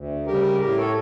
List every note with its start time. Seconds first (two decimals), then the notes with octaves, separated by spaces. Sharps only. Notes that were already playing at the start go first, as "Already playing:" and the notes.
Already playing: D2
0.26 C#3 G3 G4 A#4
0.60 A2 G4 A#4
0.78 A4 C#5